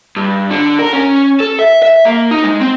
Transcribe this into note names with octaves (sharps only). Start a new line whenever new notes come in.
G2
D3
A#4
C#4
A4
E5
E5
A#3
D#4
G#3
C4